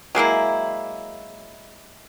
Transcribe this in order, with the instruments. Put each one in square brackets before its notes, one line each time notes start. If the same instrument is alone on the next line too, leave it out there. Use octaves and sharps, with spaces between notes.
[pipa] F#3 G#3 A#3 E4